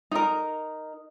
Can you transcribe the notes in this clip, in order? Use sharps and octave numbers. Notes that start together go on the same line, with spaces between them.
D#4 A#4